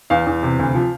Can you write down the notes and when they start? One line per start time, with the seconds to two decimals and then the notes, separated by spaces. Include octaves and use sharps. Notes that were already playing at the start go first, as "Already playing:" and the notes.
0.10 E2 F5
0.27 E2
0.43 C3
0.59 D2
0.75 F3